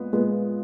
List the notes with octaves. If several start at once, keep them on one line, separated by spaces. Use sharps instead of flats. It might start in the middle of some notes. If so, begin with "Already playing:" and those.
Already playing: A#2 G#3 B3
A#2 G#3 B3